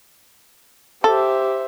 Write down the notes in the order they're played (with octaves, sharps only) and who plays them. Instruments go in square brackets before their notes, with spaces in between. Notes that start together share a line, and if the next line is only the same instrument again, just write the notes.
[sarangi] G4 [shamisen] A4 [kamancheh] C5 E5